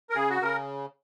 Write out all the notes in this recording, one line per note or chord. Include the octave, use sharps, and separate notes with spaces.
A#4
C#3 G#4
F#4
C#3 A#4